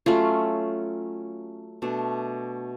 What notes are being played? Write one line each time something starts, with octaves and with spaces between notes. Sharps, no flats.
F#3 A3 C#4 F4
B2 A3 D4